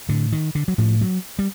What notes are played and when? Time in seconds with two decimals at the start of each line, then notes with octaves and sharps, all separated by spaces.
0.09 A2 D3
0.32 D#3
0.55 D3
0.68 F#3
0.78 A2 F3
1.01 F#3
1.39 G3